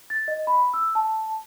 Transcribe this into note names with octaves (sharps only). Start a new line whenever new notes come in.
A6
D#5
B5
E6
A5